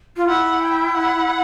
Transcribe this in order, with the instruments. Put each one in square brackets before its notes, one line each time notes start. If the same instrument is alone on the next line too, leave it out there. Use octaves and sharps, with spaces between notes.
[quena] F4
[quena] E4 [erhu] F#5
[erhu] G5
F#5